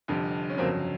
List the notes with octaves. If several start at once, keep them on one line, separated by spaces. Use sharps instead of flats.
F1 F2 D3 G3
C#4
G1 F2 C#3 F#3 A#3 C4